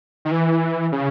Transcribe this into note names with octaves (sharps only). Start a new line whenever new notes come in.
D#3
E3
C#3